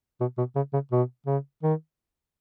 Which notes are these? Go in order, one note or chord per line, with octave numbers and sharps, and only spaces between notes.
B2
B2
C#3
C#3
B2
C#3
D#3